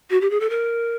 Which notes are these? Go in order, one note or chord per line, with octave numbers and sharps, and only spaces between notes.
F#4
G4
G#4
A4
A#4